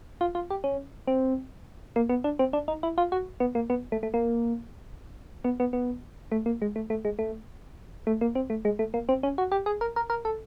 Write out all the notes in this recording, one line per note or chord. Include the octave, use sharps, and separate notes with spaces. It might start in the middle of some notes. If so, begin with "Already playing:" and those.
F4
F4
G4
C#4
C4
A#3
B3
D4
C4
D4
D#4
E4
F4
F#4
B3
A#3
B3
A3
A3
A#3
B3
B3
B3
A3
A#3
G#3
A3
A3
G#3
A3
A3
A#3
C4
A3
G#3
A3
A#3
C4
C#4
F#4
G4
G#4
A#4
A#4
A#4
A4